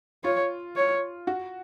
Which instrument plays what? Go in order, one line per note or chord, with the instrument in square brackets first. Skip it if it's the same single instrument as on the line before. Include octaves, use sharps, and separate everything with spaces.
[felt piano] F4 [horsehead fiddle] C#5
[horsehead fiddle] C#5
[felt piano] F#4